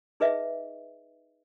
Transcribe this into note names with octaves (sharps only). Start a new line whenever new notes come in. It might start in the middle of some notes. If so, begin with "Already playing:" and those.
D#4 G#4 B4 D#5 E5